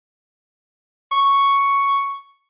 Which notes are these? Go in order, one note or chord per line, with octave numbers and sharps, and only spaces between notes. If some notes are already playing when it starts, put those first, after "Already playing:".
C#6